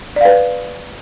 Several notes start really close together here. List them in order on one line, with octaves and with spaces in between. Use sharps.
D5 F5 B4